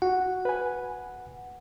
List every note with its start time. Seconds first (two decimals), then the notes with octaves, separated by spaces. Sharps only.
0.02 F#4 F#5
0.45 B4 G#5